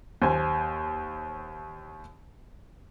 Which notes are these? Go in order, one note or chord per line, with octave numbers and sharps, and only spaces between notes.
D#2 C5 G#5